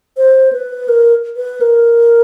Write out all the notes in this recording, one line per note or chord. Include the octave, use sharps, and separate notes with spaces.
C5
B4
A#4
B4
A#4